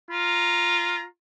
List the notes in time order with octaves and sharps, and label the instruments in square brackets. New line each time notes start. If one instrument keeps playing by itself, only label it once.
[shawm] F4 [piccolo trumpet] A#5